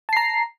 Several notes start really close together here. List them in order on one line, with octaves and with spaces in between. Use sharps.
A5 C7 A#5